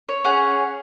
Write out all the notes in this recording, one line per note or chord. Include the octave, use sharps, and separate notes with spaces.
C#5
C#4 G#4 F#5